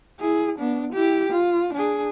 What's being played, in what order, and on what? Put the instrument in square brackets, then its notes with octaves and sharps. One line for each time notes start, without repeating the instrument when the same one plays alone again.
[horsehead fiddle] E4 G#4
B3 D4
E4 G4
F4
D4 G#4